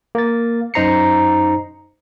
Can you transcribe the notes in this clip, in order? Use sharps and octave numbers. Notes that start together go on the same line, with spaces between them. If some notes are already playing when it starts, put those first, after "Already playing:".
A#3 A6
F#2 D#4 C5 A#5 C7 C#7